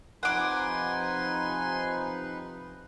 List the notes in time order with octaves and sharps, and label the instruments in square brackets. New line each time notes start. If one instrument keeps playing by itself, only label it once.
[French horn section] C3 F3 [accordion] D#4 B4 [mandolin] F#5 D6 [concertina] G#5 C6